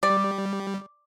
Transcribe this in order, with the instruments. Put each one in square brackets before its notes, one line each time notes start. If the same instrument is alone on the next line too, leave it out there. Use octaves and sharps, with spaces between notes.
[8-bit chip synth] G3 [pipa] D5